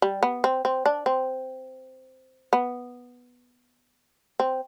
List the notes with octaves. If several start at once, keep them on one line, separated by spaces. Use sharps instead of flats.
G3
B3
C4
C4
D4
C4
B3
C4